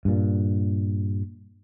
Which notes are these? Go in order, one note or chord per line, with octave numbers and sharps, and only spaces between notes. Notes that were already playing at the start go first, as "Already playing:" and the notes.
G2 A#2